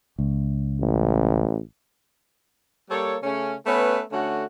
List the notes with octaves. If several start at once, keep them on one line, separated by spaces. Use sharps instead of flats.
C#2
A1
G3 A#3 A4 C#5
C#3 A3 C#4
A3 B3 C#4 B4
D3 A3 C#4 F#4